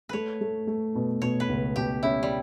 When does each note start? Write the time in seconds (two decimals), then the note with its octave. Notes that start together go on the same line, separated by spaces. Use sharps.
0.09 A3 B4 C#5
0.41 A3
0.67 A3
0.95 B2
1.22 B2 C#5
1.40 B4
1.49 C#2
1.76 B2 G4
2.03 C#4 E4
2.23 G3